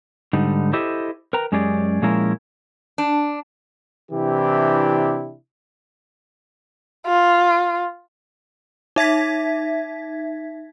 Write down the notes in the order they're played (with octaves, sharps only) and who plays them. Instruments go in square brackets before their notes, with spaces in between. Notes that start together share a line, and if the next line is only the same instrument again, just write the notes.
[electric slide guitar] G#2 D3 G3 D#4
E4 G4 A4 C5 D#5 E5
A#4 B4 G5 A#5
F#2 G#3 C#4 G4 G#4 D5
A#2 F3 G#3 C#4 E4 A#4
[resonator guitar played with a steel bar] D4
[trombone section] C3 E3 D4 E4 G4
[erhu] F4
[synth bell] D#4 E5 G#6 B6